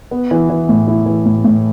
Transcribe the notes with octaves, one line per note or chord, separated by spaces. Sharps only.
B3
E3
E3
A2
E4
E3
A2
A2